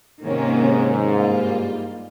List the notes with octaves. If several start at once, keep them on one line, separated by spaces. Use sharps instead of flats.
G#2 C3 D#3 A#3 C#4
G2 G3 A#3 F4